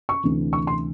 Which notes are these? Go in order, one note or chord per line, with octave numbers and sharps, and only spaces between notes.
C#6
D2 C3 E3
C#6
C6